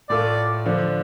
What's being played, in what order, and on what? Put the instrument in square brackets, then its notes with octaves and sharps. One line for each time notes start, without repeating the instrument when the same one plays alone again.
[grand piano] A2 A3 F4 A4 [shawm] D5
[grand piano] D3 F3 D4